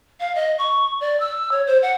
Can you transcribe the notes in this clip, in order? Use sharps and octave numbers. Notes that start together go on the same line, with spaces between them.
F5
D#5
C#6
D5
E6
C#5
C5
F#5